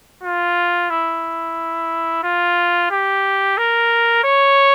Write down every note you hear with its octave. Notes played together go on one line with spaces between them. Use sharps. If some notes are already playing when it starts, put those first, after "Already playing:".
F4
E4
F4
G4
A#4
C#5